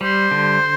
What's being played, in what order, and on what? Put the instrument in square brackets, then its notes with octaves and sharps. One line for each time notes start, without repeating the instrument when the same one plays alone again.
[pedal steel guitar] G3 [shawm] C5
[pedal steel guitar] D3